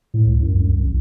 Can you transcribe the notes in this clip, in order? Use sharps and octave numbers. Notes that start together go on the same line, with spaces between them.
A2
C#2
F#2
F#2
C2
A1